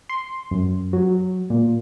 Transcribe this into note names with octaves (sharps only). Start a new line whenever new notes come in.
C6
F#2
F#3
A#2